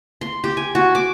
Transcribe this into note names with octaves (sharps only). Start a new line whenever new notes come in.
C6
G4
G#5
F#4
D6